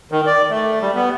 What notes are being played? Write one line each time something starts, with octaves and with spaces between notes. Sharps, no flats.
D#3
D5
A3
G3
B3